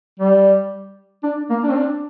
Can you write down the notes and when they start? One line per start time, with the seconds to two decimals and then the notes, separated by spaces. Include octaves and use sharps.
0.19 G3
1.23 D4
1.50 A#3
1.63 D4
1.69 C4
1.75 D4